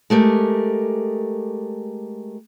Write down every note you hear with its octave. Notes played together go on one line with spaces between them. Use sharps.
G#3 A3 G4 A#4